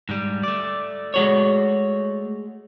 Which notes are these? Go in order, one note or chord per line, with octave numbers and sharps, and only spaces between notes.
G#2 G3
A3 D5
G#3 F#4 C#5